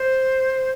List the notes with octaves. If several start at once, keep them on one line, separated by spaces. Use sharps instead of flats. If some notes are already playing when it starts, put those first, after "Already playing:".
Already playing: C5